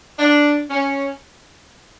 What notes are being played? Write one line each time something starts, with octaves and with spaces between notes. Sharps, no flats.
D4
C#4